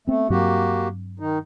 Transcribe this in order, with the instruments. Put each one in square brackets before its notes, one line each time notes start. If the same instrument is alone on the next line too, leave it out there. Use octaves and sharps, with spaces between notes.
[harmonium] A3 [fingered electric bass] B3 C4
[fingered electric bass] G2 F#3 C4 [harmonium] A#3 F#4 G4
[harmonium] D#3 D#4